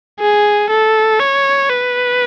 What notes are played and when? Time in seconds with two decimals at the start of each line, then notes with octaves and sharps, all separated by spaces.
0.20 G#4
0.70 A4
1.20 C#5
1.69 B4